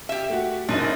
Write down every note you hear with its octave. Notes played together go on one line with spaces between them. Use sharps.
G4 E5
A3 F#4
F#1 F#2 D4 D#4